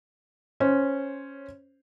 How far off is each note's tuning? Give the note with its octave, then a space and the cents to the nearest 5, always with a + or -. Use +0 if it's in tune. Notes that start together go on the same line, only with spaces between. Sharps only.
C#4 -5 C5 +0